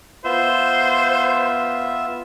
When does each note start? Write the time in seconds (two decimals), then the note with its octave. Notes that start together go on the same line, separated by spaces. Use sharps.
0.24 B3 F4 C5 E5